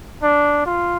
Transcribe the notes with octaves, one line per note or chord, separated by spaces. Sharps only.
D4
F4